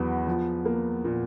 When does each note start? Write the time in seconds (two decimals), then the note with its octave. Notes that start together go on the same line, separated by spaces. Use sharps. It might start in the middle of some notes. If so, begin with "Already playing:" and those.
Already playing: E2 F#3 B3
0.27 F3
0.65 A#3
1.04 A#2